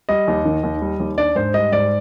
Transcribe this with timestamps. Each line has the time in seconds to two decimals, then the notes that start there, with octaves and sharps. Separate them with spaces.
0.09 G3 D#5
0.28 D#2
0.45 D#3
0.63 D#2
0.82 G3
1.00 D#2
1.18 D4 D5
1.35 G#2 C5
1.54 G3 D#5
1.72 G#2 D5